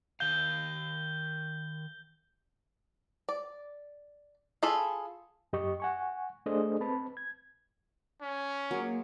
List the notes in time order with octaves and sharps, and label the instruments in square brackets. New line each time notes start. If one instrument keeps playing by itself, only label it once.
[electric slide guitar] D#3 F5 [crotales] G6 G7
[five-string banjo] D5
F4 G#4 A4 B5
[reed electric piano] F#2 G4 D#5 C#6
F#5 G#5 C#6
A3 D4 G#4 A4 C5 D#5
C4 B4 A5 B5
G#6
[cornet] C#4
[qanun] F#3 G#3 [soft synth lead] A#3